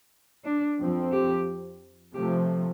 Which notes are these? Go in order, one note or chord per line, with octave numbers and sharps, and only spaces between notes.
D4
F2 F3 C4
G4
C3 F3 A3 G4